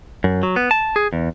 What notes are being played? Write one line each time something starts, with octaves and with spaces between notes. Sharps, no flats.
F#2
F#3
B3
A5
G#4
E2